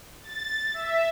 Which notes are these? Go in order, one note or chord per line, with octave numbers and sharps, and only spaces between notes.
A6
E5